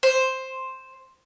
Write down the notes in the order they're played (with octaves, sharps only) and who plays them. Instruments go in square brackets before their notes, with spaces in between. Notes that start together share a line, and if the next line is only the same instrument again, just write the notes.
[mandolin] C5